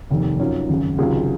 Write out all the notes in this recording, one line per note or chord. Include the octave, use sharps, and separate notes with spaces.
F1 D#2 D#3
F#2 D#3 F#3 C#4 F4
G#1 F#2 C#3
C#2 C3 D#3 F#3 F4 G#4